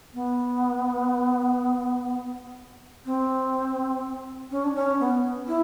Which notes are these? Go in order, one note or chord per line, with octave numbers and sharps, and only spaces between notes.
B3
C4
C#4
D4
C#4
B3
E4